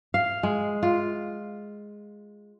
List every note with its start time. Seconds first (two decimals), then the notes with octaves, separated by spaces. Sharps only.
0.14 F5
0.43 G#3
0.83 F4